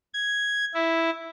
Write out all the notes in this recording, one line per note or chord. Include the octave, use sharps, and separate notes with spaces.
G#6
E4